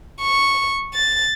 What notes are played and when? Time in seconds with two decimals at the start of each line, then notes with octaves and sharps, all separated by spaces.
0.22 C#6
0.94 A6